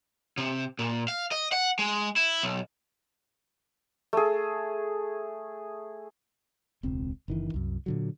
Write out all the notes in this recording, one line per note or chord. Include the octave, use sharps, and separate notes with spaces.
C3
A#2
F5
D#5
F#5
G#3
E4
B1
A3 G#4
E1 C#2 C4
F#1 D#3 E3
C2 F#2
A#2 D3 F#3